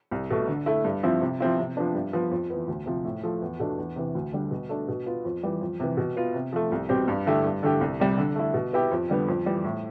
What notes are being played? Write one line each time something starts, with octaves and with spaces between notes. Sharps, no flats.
C2
B2 A3
D3
A3 E4
G2
F3 C4 E4
C3
F3 C4 E4
C3
F3 B3 D4
G2
F3 B3
F2
E3 B3
D2
C3 F3
A2
F3 A3
E2
B2 A3 D4
E2
C3 E3
D2
D3 G3
B2
A3 D4
B2
B3 F4
F2
E3 G3
F2
C3 E3
B2
B3 F4
C3
F3 A3
C2
B2 G3 C4 G4
G2
D3 A3 E4 G4
G2
D3 A3 E4 G4
C2
C3 G3
D3
A3 E4
B2
B3 E4 G4
F2
D3 G3 B3
F2
E3 G3
A2